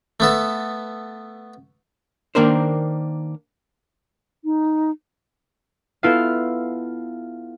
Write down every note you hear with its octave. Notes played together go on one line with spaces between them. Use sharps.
A3 B3 A4
D#3 A#3 D4 A#4 C5
D#4
B3 E4 F4 A4 E5 F5